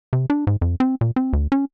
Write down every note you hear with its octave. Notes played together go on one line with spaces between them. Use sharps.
C3
D4
G#2
F2
C4
A#2
C4
D2
C#4